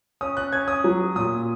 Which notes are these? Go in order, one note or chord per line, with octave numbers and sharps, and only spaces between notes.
C#4 D#6
F#6
C#4 G#6
D#6
F#3
A#2 D#6